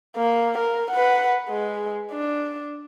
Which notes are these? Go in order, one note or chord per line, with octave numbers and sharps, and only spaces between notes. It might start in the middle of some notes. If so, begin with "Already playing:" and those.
A#3
A#4
B4 F#5
G#3
D4